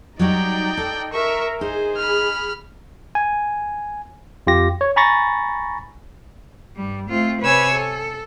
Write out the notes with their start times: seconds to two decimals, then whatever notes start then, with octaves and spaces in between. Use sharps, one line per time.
0.19 F#3 G3 D#4 F#4 D5 G5
0.77 A4
1.13 A#4 E5 C#6
1.61 D#4 G#4 C5
1.97 B5 F6
3.15 G#5
4.47 F2 F4 G4 A#6
4.81 C#5
4.96 G#5 A#5 B5 C#6 A6 A#6
6.77 G2 G3
7.08 A3 C4 F4
7.42 C3 B4 C#5 G#5 E6 G#6
7.74 A4